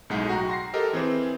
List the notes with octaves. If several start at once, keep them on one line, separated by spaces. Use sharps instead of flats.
B1 A2 G#3 D#4 F#5
F#4 F#5 G5 A#5
C6 A#6 C7
G4 A4 A#4 D#5
E3 C4 G#4 C5